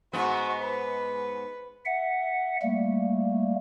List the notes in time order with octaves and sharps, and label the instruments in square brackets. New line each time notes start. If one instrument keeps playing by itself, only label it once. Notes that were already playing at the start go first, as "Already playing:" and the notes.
[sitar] G#2 B3 [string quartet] F#4
[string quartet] B4
[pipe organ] E5 F#5
G3 A3 A#3